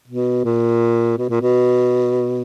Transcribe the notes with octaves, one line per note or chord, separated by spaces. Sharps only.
B2
A#2
B2
A#2
B2